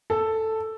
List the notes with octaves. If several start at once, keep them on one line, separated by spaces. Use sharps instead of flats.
A4